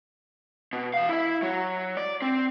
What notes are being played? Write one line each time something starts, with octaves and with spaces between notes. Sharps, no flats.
B2
E3 F5
E4 E5
F#3
D5
C4